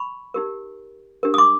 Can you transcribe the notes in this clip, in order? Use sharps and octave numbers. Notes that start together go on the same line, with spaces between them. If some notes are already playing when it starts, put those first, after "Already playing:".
Already playing: B5 C#6
D#4 G4 A#4
D4 G4 A#4
D#6
C6 D6